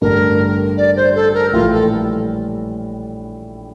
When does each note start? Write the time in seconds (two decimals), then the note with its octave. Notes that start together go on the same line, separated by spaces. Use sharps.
0.02 A1 G2 D3 A#4
0.77 D5
0.96 C5
1.15 A4
1.34 A#4
1.53 A#1 A2 E3 G3 F4
1.72 A4